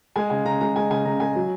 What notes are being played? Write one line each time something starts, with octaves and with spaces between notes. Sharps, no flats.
G#3 G#5
C#3 G#5
C#3 A#5
G#3 A#5
G#3 G#5
C#3 G#5
C#3 A#5
G#3 G#5
F#3